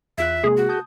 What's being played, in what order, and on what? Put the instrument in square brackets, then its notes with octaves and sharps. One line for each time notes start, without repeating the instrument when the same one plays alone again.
[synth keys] E2 F4 F#6 [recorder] E5
[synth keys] C3 G#3 A#3 [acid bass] G#4
[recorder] F#4
[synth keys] A5 D#6 G6